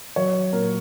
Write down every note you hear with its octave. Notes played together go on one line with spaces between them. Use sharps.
F#3 C#5
A#2 A#4